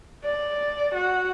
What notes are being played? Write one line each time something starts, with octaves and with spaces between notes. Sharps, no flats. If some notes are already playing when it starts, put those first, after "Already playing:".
D5
F#4